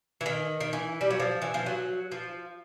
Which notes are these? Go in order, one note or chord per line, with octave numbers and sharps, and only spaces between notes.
E3
D#3
D#3
E3
G3
F#3
F3
E3
F3
F#3
F3